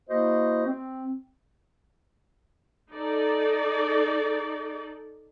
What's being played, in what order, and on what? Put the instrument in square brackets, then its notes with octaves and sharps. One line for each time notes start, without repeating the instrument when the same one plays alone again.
[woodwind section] A#3 E4 F#4 C5 D#5
C4
[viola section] D#4 A4 D5